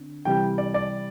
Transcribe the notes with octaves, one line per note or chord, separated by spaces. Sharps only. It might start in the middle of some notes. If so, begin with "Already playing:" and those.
Already playing: D3 C4
C3 E3 G3 G5
D5
D5